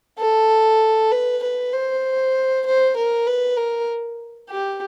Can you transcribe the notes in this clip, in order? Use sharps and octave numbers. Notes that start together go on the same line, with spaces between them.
A4
B4
B4
C5
C5
A#4
B4
A#4
G4